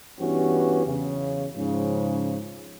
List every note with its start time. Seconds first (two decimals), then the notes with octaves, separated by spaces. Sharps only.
0.20 G2 E3 B3 C#4 F#4 G4
0.85 E2 C#3
1.56 G#2 C#3 F3